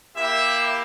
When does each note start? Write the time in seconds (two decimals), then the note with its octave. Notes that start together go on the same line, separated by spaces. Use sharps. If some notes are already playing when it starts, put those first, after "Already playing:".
0.16 A#3 E4 G4 E5